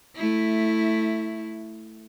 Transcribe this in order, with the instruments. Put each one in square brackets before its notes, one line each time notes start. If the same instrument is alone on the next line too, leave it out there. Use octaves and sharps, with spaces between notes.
[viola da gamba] A3 E4